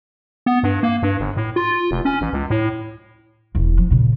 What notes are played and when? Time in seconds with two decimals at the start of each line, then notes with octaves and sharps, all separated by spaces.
0.46 B3
0.63 G2
0.83 A#3
1.03 G2
1.20 G1
1.37 A2
1.56 F4
1.91 F1
2.05 C#4
2.21 A1
2.33 C#2
2.50 A2
3.55 E1 E2
3.78 F3
3.90 A#2 C#3